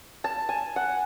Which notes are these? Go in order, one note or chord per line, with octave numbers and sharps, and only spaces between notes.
A5
G#5
F#5